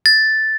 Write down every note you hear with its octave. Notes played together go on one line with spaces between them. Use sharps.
A6